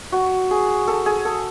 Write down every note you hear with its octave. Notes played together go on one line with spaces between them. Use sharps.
F#4
G#4
A4
G#4
A4